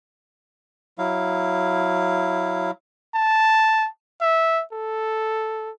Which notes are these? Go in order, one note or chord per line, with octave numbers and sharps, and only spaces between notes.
F#3 E4 F5
A5
E5
A4